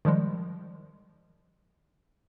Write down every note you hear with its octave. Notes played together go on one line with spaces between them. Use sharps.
D#3 F3 G3 G#3